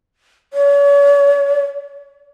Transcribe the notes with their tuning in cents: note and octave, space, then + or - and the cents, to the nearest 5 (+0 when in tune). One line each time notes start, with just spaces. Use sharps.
C#5 +40